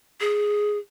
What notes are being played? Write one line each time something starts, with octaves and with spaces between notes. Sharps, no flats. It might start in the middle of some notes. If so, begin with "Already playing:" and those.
G#4